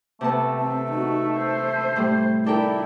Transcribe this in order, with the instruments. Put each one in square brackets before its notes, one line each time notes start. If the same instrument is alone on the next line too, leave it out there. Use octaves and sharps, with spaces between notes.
[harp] C3 B3 A5 [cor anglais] A3
[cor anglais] A3 [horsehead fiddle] C4
[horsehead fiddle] D#4 F#4
C5
[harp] A2 G3
[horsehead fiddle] E4 [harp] A4 A#4 G5 [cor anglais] D5